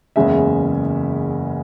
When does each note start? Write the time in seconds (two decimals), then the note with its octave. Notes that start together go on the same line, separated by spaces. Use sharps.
0.16 F#1 E2 C#3 G#3 E5